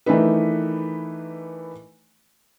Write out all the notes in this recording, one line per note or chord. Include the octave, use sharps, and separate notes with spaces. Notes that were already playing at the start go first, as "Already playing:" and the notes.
D#3 E3 A3 D4 D#4 B4